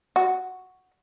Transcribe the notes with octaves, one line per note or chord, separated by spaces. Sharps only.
F#4